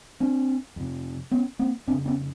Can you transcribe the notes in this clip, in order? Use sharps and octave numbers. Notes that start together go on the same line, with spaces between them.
C4 D4
F2 C3
B3 C#4
A#3 C4
F2 C#3 C4 D4
B3 C#4